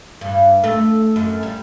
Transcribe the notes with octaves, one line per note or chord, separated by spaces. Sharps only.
G2
A3
F#2
G3